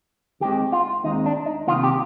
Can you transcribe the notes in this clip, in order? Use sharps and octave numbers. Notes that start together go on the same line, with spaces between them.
D#2 D#3 G#3 C4 G4
F4
D#2 D#3 G#3 C4 D#4
D4
D#4
C2 C3 D#3 A#3 F4
G4